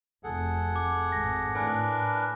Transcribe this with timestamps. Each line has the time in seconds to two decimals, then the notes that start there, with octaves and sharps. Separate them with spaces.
0.24 F1 G#4 A4 F#5
0.76 D6
1.12 G#1 A#6
1.55 A2 D4 A#4 B4 G#5